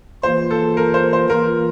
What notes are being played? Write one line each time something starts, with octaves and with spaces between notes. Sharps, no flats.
E3 A#3 F4 C5
A4
A#4
C5
C5
E3 A#3 F4 A#4